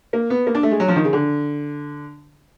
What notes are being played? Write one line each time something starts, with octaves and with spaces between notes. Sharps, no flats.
A#3
B3
A#3
D4
A3
G#3
F#3
F3
D#3
C#3
D3